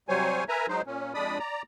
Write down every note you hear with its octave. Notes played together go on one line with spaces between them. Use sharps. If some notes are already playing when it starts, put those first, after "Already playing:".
C3 F#3 G3 C5 C#5 G#5
A#4 B4 E5 G#5 A#5
F#3 G#3 D#4 C5
A#2 C#4
F2 G#3 D4 D5 B5 D#6
D5 A#5